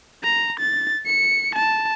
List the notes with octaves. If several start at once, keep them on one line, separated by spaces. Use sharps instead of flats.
A#5
A6
C#7
A5